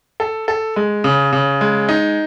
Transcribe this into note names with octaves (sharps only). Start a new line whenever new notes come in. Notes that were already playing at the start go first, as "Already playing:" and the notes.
A4
A4
G#3
C#3
C#3
G#3
D#4